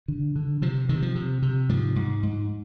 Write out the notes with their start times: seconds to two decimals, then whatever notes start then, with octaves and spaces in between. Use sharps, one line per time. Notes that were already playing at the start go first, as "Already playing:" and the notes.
0.08 D3
0.36 D3
0.62 C3 F3
0.89 C3 D#3
1.02 F3
1.15 C3
1.42 C3
1.69 G#2 F3
1.96 G#2
2.23 G#2